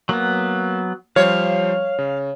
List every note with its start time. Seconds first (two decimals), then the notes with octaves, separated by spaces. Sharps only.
0.09 F#3 A#3 B3
1.16 F3 G3 C5 C#5 F5
1.99 C#3